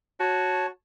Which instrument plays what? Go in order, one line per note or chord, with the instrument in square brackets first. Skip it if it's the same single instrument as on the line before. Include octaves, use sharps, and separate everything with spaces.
[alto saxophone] F#4 [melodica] C#5 A5